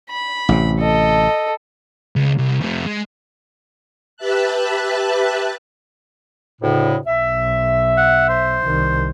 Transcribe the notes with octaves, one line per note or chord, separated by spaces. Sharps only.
B5
A1 C3
A4 D#5
C#2
C2
F2 A3
G#3
G4 B4 E5 A5 F#6
D2 A2 C#3
B1 E5
F#5
C5
C2 D#3